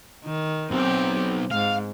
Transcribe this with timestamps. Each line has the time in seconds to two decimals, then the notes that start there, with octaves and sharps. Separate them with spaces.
0.25 D#3
0.71 B1 C4 G4
1.51 G#2 F5